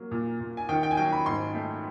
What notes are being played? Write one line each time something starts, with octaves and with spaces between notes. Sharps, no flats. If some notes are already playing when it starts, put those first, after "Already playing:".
Already playing: F#3 A#3
A#2
A#2
G#5
D#3 G5
G5
G#5
F#3 G5
B5
G#2 C6
A3